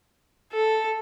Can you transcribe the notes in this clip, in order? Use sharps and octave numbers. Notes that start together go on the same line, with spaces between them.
A4